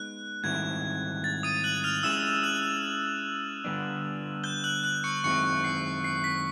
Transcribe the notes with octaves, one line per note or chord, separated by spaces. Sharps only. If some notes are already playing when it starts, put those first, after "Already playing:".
Already playing: G#3 B3 D#4 F#6
G#2 D#3 G3 C4 E4 G#6
A6
D#6 D#7
F#6 F#7
F6 F7
G#3 C#4 E4 E6 E7
F#6 F#7
D3 G3 B3 D4
G6 G7
F#6 F#7
F#6 F#7
C#6 C#7
F#2 D#3 G#3 C4 E4 C#6 C#7
C7
C7
B6